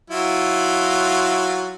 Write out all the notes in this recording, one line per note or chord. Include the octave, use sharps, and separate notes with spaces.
F#3 E4 F4